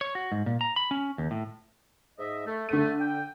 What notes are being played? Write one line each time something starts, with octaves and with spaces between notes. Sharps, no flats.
C#5
F#4
G#2
A#2
A#5
B5
C#4
D#2
A2
G#2 D#5 E5
A3
D3 A3 D#7
G5